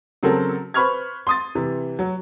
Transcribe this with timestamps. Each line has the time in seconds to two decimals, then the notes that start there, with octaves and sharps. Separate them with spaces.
0.23 C#3 F#3 C4 A4 A#4
0.74 B4 C5 B5 C#6 F6 G#6
1.27 C6 D#6 A6
1.55 C3 E3
1.99 F#3